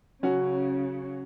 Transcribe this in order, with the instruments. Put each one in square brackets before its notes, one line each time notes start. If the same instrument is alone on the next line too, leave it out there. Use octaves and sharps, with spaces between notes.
[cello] C#3 [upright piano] F#3 C#4 F#4